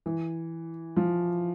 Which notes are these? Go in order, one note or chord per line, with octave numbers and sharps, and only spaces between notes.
E3
F3